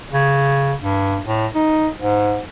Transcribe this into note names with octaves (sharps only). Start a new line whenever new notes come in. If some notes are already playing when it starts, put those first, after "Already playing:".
C#3
G2
A2
D#4
G#2